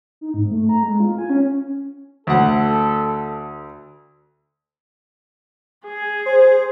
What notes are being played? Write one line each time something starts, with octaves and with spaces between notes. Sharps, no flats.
D#4
G#2
A3
A#5
G#3
F4
G#5
C#4
D2 A4 F#5
G#4
C5